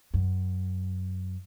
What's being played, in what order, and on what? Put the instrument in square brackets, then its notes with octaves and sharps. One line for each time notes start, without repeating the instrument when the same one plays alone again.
[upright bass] F#2